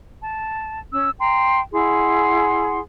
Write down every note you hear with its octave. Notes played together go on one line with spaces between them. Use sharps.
A5
C#4 E6
G5 A#5 C6
E4 G#4 F#5 C6